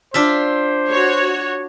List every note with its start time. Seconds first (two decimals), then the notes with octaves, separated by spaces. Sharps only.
0.14 D4 F4 C5 E5
0.91 F#4 C#5